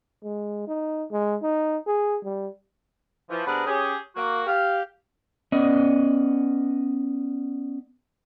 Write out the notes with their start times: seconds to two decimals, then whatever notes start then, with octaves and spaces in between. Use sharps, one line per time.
0.24 G#3
0.67 D#4
1.11 G#3
1.42 D#4
1.86 G#4
2.24 G3
3.30 E3 F3
3.47 C3 B3 D4 G#4 A#4 B4
3.67 C#4 G4 G#4
4.16 A#3 F#4
4.47 G4 F5
5.52 B3 C#4 D5 D#5